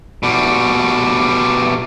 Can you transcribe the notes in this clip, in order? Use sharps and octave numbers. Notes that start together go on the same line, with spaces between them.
B2 G3